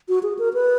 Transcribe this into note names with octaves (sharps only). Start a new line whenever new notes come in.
F#4
G#4
A#4
B4